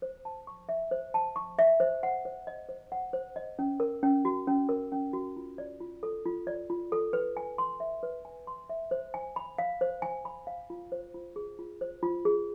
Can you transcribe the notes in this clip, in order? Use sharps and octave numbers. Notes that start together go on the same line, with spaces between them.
C5
A5
C#6
E5
C5
A5
C#6
E5
C5
F#5
C5
D#5
C5
F#5
C5
D#5
C#4
A#4
C#4
F#4
C#4
A#4
C#4
F#4
F4
D5
F4
A4
F4
D5
F4
A4
B4
G#5
C6
E5
B4
G#5
C6
E5
C5
G#5
B5
F5
C5
G#5
B5
F5
F4
C5
F4
G#4
F4
C5
F4
G#4